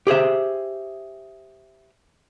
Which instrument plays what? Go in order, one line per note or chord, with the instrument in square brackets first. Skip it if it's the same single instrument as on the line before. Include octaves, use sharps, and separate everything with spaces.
[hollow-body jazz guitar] G4 G#4 C5 E5